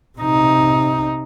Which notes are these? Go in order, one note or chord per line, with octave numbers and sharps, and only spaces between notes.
C3 D#4